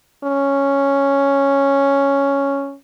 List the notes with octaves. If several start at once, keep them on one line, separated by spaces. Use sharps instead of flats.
C#4